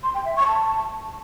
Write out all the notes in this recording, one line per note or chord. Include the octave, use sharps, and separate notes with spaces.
C6
G5
E5
C#6
A5